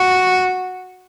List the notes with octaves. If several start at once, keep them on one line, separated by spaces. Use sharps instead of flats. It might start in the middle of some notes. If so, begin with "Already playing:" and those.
Already playing: F#4